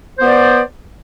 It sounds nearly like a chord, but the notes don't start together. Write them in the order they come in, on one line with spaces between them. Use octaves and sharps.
C5 B3 D5